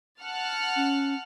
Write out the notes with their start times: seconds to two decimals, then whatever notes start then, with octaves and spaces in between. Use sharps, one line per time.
0.22 F#5 A5 F6
0.76 C#4